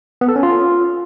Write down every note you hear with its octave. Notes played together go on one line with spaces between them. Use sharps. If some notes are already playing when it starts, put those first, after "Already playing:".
B3
A4
C#4
F4